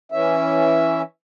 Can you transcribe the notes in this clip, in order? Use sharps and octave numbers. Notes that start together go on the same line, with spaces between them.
E3 C#4 E5